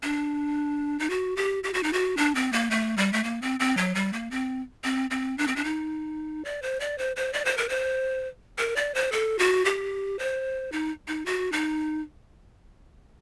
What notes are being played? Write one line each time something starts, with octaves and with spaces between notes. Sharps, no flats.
D4
D#4
F#4
G4
G4
F#4
D#4
F#4
D4
C4
A#3
A3
G3
A3
A#3
C4
C4
F#3
G3
A#3
C4
C4
C4
D4
C4
D4
D#4
D5
C5
D5
C5
C5
D5
C5
A#4
C5
A#4
D5
C5
A4
F#4
G4
C5
D#4
D#4
F#4
D#4